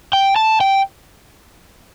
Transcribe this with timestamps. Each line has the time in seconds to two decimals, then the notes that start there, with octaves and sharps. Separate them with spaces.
0.13 G5
0.36 A5
0.61 G5